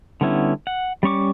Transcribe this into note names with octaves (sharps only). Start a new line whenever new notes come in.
D3 G3 B3 C#4 E4
F#5
G3 C#4 C#6 D6